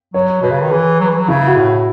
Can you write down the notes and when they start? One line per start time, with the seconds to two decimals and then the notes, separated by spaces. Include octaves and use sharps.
0.14 F#3 C#5
0.41 B2 B4
0.51 C#3
0.62 D#3
0.71 E3 G#4
1.00 F#3
1.09 E3
1.18 F#3
1.28 C#3 E4
1.47 F#4
1.57 A2
1.67 F#4